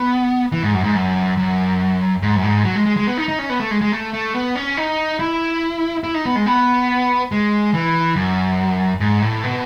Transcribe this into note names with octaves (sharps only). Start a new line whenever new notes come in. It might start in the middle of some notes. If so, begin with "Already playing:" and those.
Already playing: B3
E3
G#2
F#2
G#2
F#2
F#2
G#2
F#2
G#2
F#3
G#3
G#3
G#3
B3
D#4
D#4
C#4
B3
A3
G#3
G#3
A3
A3
B3
C#4
D#4
E4
E4
D#4
B3
G#3
B3
G#3
E3
F#2
G#2
A2
B2